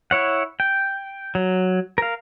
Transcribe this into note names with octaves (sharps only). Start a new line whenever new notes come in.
E4 C#5 F#5
G5
F#3
A#4 F5